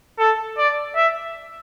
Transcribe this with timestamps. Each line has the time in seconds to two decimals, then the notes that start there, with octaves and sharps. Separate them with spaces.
0.19 A4
0.57 D5
0.96 E5